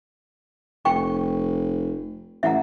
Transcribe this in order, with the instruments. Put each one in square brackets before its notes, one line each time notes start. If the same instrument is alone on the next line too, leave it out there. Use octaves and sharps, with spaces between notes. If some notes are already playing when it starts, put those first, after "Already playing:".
[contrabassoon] F1 [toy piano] G4 G5 C#6
[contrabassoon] A1 [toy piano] E5 F#5 A#5